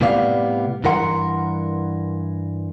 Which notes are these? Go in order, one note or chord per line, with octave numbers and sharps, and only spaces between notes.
A2 C3 G3 B3 D5 F5
G2 E3 A#4 F#5 C6